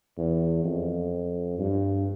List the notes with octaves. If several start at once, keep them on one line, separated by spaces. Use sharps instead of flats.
E2
F2
G2